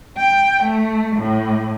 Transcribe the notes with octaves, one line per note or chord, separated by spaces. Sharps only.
G5
A3
A2